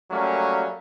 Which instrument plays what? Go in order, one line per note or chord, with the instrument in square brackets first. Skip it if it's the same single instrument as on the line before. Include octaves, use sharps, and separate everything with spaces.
[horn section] F#3 G3 A3 A#3 C#4